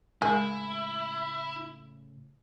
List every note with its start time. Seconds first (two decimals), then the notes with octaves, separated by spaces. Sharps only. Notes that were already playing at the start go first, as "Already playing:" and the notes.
0.22 A2 C#3 G#3 A3 E4 G#4 A#4